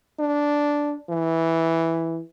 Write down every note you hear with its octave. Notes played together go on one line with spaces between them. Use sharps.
D4
E3